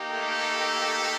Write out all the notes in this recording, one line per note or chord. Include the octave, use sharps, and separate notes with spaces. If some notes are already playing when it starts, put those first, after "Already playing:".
Already playing: A#3 D#4 G4
A3 A4